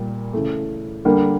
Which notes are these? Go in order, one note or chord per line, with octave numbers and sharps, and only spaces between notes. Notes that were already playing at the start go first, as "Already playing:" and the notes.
Already playing: A#2 G3 A#3
C#3 E3 A3
D3 G3 A#3